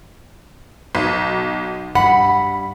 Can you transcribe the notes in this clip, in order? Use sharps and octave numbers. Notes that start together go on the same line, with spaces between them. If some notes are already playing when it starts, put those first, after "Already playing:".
B1
G2 F#5 B5